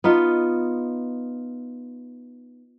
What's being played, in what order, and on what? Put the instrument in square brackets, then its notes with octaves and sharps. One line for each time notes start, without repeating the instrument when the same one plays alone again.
[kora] B3 D#4 F4